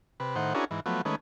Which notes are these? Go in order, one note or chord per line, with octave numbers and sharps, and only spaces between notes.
C3 B4
A2 D#3 C5 F#5
C#4 D4 E4 F#4 G#4 A#4
G#2 E3
F3 F#3 A3 B3
D#3 G#3 A3 C#4 B4